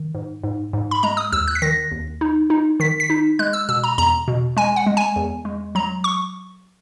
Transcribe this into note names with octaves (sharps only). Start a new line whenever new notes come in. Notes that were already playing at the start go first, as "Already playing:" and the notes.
Already playing: D#3
G#2
G#2
G#2
B5
G#3 A#5
D#6
D#2 E6
F#6
B6
D#3 A#6
D#2
D#4
D#4
D#3 B6
B6
D#4
G#3 F#6
E6
B2 E6
A#5
E2 A#5
B2
G#3 G#5
F#5
G#3
G#5
E2
G#3
F#3 A#5
C#6